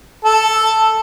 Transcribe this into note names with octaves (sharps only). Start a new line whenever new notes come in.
A4